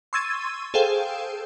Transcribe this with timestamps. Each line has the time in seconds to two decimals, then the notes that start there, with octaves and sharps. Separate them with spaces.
0.13 C6 C#6 E6 G#6 A6 D#7
0.74 G#4 A4 C5 F5 G5